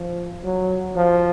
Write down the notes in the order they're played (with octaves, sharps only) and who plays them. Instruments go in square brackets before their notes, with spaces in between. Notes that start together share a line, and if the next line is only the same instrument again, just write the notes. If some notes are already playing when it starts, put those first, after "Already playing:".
Already playing: [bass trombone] F3
F#3
F3